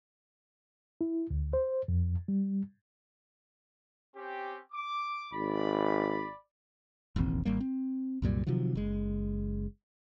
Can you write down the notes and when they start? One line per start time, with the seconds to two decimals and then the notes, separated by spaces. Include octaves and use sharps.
1.01 E4
1.31 D2
1.53 C5
1.88 F2
2.28 G3
4.15 C4 C#4 G4
4.72 D6
5.34 G#1 D5 B5
7.16 E1 A1 D#2 C4
7.45 G#1 G3 A#3
7.60 C4
8.22 C2 F#2 A#2 G3
8.47 C3 D#3 F3 F#3
8.75 F#1 G#3